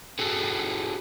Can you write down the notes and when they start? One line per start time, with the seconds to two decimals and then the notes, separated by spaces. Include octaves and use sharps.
0.19 F#4 G#4 A4